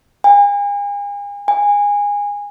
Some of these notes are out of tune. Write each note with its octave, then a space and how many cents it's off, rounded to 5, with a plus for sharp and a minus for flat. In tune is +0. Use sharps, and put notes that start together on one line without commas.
G#5 -40
G#5 -20